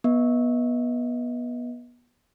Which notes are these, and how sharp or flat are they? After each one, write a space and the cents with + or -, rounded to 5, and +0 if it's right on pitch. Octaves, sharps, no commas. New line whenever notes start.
B3 -25 D#5 +30